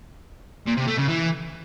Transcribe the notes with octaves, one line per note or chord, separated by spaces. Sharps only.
A#2
C3
A3
C#3
E3